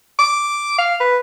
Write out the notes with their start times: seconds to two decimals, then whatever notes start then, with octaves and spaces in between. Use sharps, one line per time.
0.19 D6
0.78 F5
1.00 B4